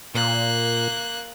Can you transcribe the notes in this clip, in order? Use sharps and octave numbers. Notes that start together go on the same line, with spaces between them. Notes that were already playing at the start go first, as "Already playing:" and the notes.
A#2 A#3 F#6